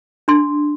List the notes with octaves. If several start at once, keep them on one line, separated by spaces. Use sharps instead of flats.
D4 C6